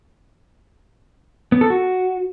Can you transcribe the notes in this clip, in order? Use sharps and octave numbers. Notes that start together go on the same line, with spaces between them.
B3
A4
F#4